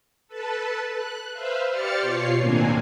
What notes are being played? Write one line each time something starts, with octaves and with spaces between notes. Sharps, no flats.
A4 B4 A5
F#6
B4 C5 E5 F5
G4 C5 D5 F6 A6 C#7
B2 F4 C#5 C7
D#2 A2 A#3 C4 D4 G#5